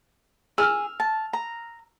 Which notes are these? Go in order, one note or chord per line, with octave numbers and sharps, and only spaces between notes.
G#4 E6 F6
A5
A#5